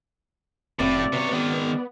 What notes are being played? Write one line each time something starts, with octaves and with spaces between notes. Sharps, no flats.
F1 A2 C#3 C4 F#4 D5
C3 B3 C#5
D#3 G#3